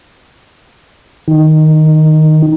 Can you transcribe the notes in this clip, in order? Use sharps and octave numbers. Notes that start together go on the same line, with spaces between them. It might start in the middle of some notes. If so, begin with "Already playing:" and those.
D#3 D#4